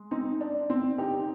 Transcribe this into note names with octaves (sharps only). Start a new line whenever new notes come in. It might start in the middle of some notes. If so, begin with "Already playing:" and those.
Already playing: G#3
C4 D#4
D4
C4
D#4 G4